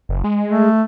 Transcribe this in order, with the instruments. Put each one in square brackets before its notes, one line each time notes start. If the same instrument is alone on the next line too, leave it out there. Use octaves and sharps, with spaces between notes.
[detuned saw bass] F#1
G#3
[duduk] A3